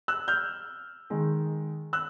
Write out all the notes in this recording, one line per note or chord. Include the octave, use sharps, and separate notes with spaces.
E6 F#6
F6 G6
D#3 G#3
E6 F#6